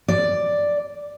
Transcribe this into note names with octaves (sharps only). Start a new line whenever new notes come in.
D5